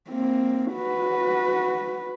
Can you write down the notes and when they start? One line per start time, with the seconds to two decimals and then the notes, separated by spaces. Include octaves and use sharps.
0.10 A#3 C4
0.73 F#4 B4